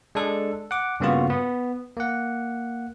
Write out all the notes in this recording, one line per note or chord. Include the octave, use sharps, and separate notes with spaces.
G#3 D4 A4
F#5 D6
G2 C#3 A#3 B3 F4 F#4
B3
A#3 F#5